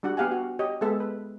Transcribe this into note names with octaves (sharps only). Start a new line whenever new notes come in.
G3 D4 F#4 F#5
B3 G4 F5 F#5 G#5
F#4
G4 C#5 D#5
G#3 B3 A4 E5
B4